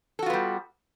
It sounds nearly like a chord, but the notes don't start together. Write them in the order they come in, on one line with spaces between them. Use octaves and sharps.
A4 F#4 F4 B3 G3